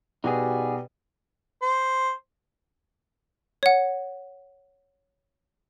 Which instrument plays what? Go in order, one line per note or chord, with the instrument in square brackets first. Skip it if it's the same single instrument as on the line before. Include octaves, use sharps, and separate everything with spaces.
[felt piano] B2 [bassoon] G3 [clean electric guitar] D#4 F#4 G#4
[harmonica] C5
[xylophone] C#5 F#5